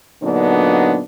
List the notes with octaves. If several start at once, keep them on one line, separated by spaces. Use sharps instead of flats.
A#2 D3 F#3 B3 D4 D#4